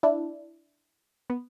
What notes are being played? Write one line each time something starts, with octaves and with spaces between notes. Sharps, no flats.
D4 E4
B3